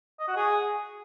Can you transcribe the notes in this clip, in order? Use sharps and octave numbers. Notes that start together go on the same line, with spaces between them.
D#5
F#4
G#4